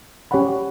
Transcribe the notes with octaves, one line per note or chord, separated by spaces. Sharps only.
C#4 G4 C#5 F#5 B5